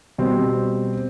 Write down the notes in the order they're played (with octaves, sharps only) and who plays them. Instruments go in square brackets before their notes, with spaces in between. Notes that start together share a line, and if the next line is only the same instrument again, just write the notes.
[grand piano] B2 G3 C4